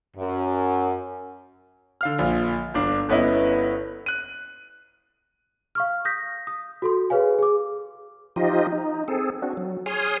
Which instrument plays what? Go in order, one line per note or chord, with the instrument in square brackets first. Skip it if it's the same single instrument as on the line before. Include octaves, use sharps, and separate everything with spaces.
[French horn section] F#2
[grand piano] D3 F5 F6
A#1 F4
G1 D4 F5
G1 B3 C#4 E4 B4 D#5
F#6 D#7
[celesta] F5 C#6 F6
D#6 G6 A#6 B6
D#6
F#4 A4 C6
G#4 B4 C#5 F5 G#5
G#4 D6
[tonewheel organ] F3 D#4 F4 G4 D#5
D#4
C4 G#4 A4
C4 D4 F#4
F#3
G#4 C#5 G#5 C6 D#6 F6